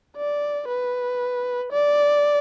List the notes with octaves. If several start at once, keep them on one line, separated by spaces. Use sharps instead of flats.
D5
B4
D5